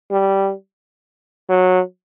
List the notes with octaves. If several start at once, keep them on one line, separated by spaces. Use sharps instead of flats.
G3
F#3